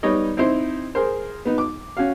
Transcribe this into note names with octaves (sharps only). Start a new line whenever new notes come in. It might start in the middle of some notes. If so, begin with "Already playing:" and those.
G3 B3 D#4 C#5 D#5
C4 D#4 E4 C5
G#4 A#4 C5
B3 D#4
D6
C#4 F#4 F5